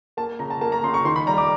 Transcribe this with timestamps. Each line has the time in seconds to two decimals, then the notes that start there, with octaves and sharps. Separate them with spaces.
0.17 A#3 A5
0.39 C#3 A#5
0.50 A5
0.61 A#3 A5
0.72 A#5
0.83 C#3 C6
0.94 C#6
1.05 D#3 C6
1.16 B5
1.27 G3 A#5
1.38 D6